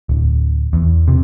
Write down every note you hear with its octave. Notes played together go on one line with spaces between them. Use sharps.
D1
E2
C3